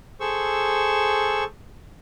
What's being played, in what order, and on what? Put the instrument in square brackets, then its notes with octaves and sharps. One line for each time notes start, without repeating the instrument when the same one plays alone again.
[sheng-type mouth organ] G#4 A4 C5 C#6 E6